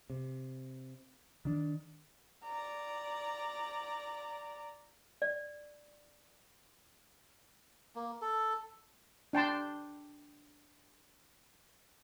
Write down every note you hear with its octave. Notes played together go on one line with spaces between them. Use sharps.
C3
D#3 D4
D5 A#5
D5
A#3
A4
D4 G5 A5 C6